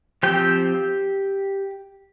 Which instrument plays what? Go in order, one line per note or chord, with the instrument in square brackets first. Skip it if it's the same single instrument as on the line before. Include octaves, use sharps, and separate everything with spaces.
[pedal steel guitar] F3 C4 G4 G5